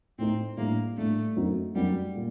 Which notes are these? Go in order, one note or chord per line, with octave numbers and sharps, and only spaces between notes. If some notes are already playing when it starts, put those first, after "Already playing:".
A2 A3 C4 D#4
A2 G3 A#3 D4
A2 G3 A3 D4
F#2 F#3 C4 D#4
F#2 F#3 G3 C4 D#4
A#2